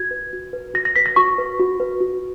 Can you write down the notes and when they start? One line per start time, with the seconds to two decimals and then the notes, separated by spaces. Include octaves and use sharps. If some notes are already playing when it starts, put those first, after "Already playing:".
Already playing: F#4 G#6
0.11 B4
0.33 F#4
0.53 B4
0.74 F#4 A#6
0.85 A#6
0.96 B4 B6
1.06 A#6
1.16 F#4 C#6
1.38 B4
1.59 F#4
1.80 B4
2.01 F#4